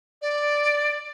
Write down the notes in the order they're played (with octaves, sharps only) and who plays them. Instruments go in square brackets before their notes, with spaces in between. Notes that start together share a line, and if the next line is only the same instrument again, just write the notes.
[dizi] D5